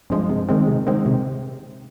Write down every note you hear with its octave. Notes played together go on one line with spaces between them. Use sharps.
G2 F3 G#3
C3
D#3 G#3 C4
C3
D#3 G#3 C4
C3